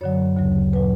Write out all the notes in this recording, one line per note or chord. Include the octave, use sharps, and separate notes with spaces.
F#2 D3 F#3 C#5
D2 C#3 F#3
A#2 F#3 B4